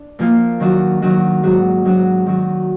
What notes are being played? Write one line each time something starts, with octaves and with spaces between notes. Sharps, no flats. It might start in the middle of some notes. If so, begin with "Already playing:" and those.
Already playing: D4
A#2 F3 A#3 F4
D#3 F#3 D4 F#4
D#3 F#3 D4 F#4
G#2 F#3 D4 F#4
G#2 F#3 D4 F#4
D#3 F#3 D4 F#4